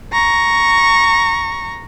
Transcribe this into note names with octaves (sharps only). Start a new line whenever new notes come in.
A#5 C#6